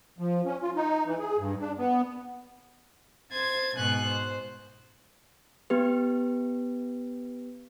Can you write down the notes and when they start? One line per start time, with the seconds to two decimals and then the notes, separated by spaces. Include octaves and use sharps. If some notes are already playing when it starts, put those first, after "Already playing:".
0.19 F3
0.46 C#4
0.62 F4
0.76 D#4
1.06 E3
1.20 G#4
1.38 G2
1.60 D4
1.78 B3
3.31 C5 G#6 A6
3.76 G#2 B2 G#5 F#6
4.07 C5
5.70 B3 G4 B4